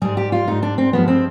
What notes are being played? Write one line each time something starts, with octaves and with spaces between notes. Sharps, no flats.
G#2 G3 G#4
G4
F4
G#2 G3 D#4
D4
C4
G2 F3 G#3 B3
C4